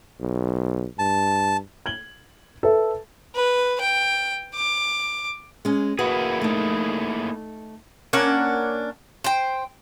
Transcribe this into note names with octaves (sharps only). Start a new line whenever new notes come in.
B1
G2 A5
G#6 F#7 G7
A4 B4 E5
B4
G5
D6
G#3 C#4
A#3 E4 F#4 G#4 B4
A3 D#4
A#3 C#4 D4 F#5
C5 G5